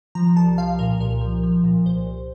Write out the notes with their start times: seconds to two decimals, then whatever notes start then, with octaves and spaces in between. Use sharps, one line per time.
0.15 F3 A#5
0.36 C2 A5
0.58 F3 F5
0.79 A#2 A#4
1.00 C2 A#4
1.21 F3
1.43 F3
1.64 A#2
1.86 C2 C5
2.07 C2